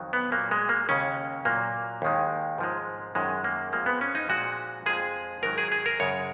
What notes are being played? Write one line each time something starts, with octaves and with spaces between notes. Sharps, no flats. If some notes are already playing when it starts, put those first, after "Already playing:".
Already playing: F2 D#3 F#3
B3
A#2 F#3 A#3
G#3
A#3
D#2 C#3 G#3 C#4
A#2 F#3 A#3
D#2 D#3 G#3
G#2 F3 G#3
F#2 D#3 G#3
A#3
F2 F3 G#3 A#3
B3
C#4
D#4
A#2 F3 G#3 F#4
F2 F3 G#3 G#4
G#2 D#3 F#3 A#4
G#4
G#4
A#4
F#2 C#3 G#3 C#5